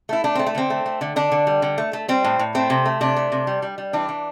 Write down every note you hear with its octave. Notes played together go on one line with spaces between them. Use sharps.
A3 E4
A3 D4
A3 C4
A3
D3 C4
A3
A3
D3
D3 D4
D3
G3
D3
A3
A3
G3 C4
A2
A2
A3 C4
C3
A3
C3 D4
A3
C3
G3
G3
G3
E3 D4
E3